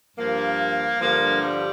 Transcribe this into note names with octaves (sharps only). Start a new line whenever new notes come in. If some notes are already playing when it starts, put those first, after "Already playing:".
G2 F3 A#3
G2 D3 F3 A#3
G3